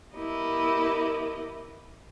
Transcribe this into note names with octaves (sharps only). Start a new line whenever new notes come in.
B3 E4 G4 A#4 D#5